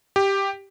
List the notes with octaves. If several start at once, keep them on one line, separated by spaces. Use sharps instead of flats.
G4